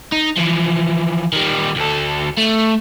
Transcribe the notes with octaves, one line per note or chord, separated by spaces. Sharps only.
D#4
E3 F3
D#3 G3
D2 A4
A3